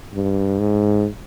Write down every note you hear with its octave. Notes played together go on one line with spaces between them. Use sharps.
G2
G#2